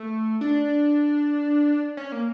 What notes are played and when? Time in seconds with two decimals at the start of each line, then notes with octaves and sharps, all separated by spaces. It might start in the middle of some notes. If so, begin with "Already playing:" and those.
Already playing: A3
0.41 D4
1.97 C#4
2.12 A#3